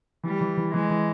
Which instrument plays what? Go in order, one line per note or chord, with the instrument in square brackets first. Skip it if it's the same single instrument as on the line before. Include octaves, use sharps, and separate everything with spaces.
[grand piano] E3 [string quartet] G3
[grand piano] E3
E3
[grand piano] E3 [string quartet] G#3
[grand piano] E3